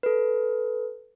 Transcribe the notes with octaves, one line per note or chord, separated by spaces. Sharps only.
A4 B4